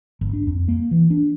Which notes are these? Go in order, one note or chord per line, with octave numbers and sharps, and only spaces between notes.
G1
D4
F2
A#3
E3
D4